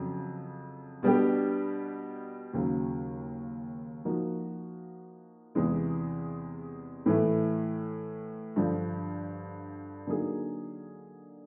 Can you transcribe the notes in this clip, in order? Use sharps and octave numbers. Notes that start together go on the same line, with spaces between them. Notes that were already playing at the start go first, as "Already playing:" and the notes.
Already playing: F2 C#3 F#3
B2 G3 B3 D4 G4
D#2 C#3 F#3
F3 A#3 D#4 F#4
E2 C3 E3 G#3
A2 E3 A3
G2 D3 F3
D3 F#3 A#3 D#4 G#4